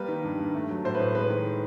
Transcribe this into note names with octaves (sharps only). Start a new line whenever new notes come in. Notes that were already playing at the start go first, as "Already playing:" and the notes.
Already playing: G3 A#3 B4
D#3
G2
G2
A3
F#3
A2 C5
B4
A2
G#3 B4
D#3